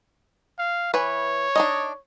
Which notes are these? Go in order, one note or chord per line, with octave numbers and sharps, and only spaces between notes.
F5
E3 B4 C#5
D4 D#4 D#5